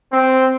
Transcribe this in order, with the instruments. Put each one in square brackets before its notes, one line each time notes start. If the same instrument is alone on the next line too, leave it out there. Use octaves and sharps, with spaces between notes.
[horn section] C4